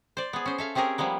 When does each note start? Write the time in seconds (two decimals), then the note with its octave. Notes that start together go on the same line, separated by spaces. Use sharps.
0.17 C5 D5
0.33 B3 G#4
0.46 C#4 C5
0.58 A4 E5 F5
0.75 C4 C#4 G4 G#4 A#4
0.98 F3 G3 A#3 B3